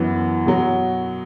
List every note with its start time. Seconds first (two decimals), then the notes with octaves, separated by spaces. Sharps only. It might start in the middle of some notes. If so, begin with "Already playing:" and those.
Already playing: F#2 E3 B3
0.46 B2 F#3